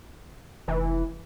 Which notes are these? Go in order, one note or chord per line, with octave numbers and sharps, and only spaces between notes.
F1 E3